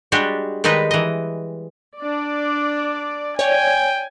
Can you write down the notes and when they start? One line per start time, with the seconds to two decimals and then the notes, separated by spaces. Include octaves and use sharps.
0.12 G3 G#3 D4 F#4 G4
0.64 D#3 G3 G#3 D#4 B4
0.91 E3 D#5
1.98 D4 D5
3.39 C#5 D5 G5 G#5